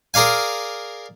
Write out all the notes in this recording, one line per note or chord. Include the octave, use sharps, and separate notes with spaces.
G#4 A#4 D5 F5 G#5